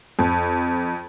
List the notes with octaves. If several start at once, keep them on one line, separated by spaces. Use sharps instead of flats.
F2